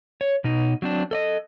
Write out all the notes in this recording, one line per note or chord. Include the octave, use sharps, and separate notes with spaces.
C#5
B2 D#4
F#3 C4 D4
A4 D5 D#5